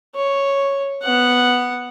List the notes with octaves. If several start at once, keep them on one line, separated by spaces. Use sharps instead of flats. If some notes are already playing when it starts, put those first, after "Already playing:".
C#5
B3 F#5